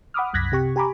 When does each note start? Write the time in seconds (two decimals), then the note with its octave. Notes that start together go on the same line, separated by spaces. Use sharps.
0.14 F#5 B5 D6 D#6 F6
0.33 C2 F#2 F#6 G#6 A#6 B6
0.52 C3 G4 C#6
0.76 G4 G#5 A#5 B5 D6